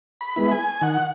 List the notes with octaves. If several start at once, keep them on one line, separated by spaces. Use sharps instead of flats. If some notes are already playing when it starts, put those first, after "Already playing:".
B5
G#3 B3 E4
G#5
D#3 F#5